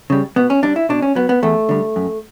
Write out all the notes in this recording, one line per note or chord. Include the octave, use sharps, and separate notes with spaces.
C#3 G3
B2 B3
C#4
G3 D4
E4
B2 D4
C#4
F#3 B3
B3
E2 A3
D3 G3
F#2